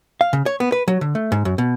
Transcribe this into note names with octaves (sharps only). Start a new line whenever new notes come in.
F5
C#3
C#5
B3
B4
F#3
D3
A3
G#2
F#2
B2